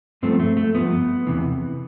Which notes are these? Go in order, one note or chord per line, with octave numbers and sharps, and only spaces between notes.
G2 F3 A3 C4
A3
A3
G2 F3 B3
E2 C3 E3